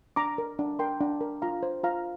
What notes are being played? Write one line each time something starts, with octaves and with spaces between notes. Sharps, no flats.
D4 A#5 D6
A#4
D4
A#4 G5 C6
D4
A#4
F4 F5 A#5
C5
F4 F5 A#5